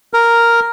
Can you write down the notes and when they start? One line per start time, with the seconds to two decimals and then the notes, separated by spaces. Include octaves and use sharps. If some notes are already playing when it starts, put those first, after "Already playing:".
0.13 A#4